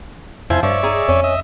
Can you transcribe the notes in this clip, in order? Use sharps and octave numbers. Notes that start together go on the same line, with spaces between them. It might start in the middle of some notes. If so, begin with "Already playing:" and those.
F2 F3 E4 C5 G#5
G2 F3 C#5 D5 E5
D#4 G#4
F2 C#4
D#5 E5